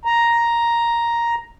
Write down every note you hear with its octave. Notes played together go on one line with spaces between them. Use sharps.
A#5